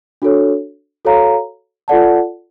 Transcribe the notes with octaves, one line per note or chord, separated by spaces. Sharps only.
D4 F#4 A4 C#5
F#4 A4 C#5 F5 A#5
F4 A4 D5 F#5 A5